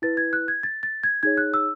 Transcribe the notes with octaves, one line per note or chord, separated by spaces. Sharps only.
E4 B4 A6
G#6
F#6
G#6
A6
A6
G#6
D#4 G#4 C#5 G#6
F#6
E6